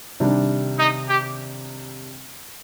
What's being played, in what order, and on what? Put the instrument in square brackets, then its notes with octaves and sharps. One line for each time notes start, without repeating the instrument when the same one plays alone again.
[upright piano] C3 D#3 G3 D4
[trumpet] D#4
G4